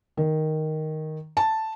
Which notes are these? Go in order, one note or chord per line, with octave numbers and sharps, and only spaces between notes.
D#3
A5